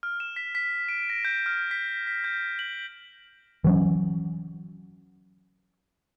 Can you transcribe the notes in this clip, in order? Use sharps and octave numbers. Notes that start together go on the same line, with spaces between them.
F6
E7
B6
B6
D7
A#6
G6
F6
B6
B6
G6
F#7
E3 F#3 C#4